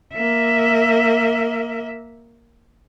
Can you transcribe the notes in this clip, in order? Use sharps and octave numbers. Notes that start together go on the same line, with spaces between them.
A#3 E5